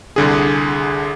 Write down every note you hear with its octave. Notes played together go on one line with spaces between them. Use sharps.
C2 D3 G#4